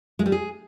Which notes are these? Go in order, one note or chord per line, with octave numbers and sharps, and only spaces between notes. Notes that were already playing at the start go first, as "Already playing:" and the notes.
G#3
G3
G#4